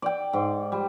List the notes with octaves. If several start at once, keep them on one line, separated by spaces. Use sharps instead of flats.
D5 G5
G#2
G3